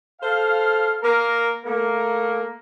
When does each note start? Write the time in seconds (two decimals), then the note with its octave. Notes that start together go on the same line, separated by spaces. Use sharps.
0.22 A4 C5 F5
1.03 A#3 A#4
1.66 A3 A#3